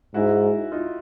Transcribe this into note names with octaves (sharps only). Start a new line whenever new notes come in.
G#2 E4 F#4
D#4 F4